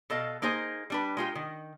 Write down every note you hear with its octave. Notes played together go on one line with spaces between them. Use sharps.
B2 A4 D#5 F5
A#3 D#4 G#4 C5
G3 D4 B4
G#3 F4 G4
D#3